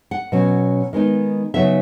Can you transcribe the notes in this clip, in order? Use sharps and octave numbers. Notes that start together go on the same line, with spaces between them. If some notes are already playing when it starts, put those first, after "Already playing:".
F#5
B2 F#3 C#4
D#3 G#3 B3 D#4
C#3 F#3 B3 D#4 E5